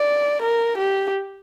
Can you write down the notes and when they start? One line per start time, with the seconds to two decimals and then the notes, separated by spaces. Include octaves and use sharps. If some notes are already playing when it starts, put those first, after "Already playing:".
Already playing: D5
0.43 A#4
0.78 G4